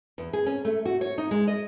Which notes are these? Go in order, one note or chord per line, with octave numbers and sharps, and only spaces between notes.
E2
G#4
C#4
A3
F#4
C#5
D#4
G#3
D#5